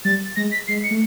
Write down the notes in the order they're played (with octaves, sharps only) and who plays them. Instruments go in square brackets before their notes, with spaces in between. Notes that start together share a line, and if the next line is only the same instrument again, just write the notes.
[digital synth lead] G3 [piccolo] A6
[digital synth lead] G#3 [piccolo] A#6
[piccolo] B6
[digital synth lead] G#3 [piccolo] C7
[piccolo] C#7
[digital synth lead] A3